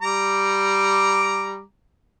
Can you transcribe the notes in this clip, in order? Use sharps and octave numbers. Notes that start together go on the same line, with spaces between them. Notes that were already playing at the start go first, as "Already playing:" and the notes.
G3 A#5 D6